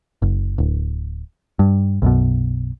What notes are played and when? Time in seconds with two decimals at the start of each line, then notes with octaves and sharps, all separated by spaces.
0.22 F#1
0.58 D1
1.59 G2
2.02 B1 F#2 B2